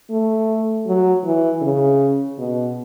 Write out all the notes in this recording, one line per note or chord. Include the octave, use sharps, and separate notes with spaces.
A3
F#3
E3
C#3
B2